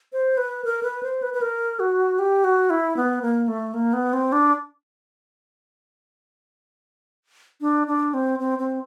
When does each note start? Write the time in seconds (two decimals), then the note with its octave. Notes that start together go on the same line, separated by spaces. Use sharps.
0.13 C5
0.37 B4
0.65 A#4
0.83 B4
1.03 C5
1.22 B4
1.34 B4
1.41 A#4
1.80 F#4
2.19 G4
2.44 F#4
2.70 E4
2.97 B3
3.22 A#3
3.48 A3
3.74 A#3
3.93 B3
4.13 C4
4.32 D4
7.61 D4
7.87 D4
8.14 C4
8.39 C4
8.59 C4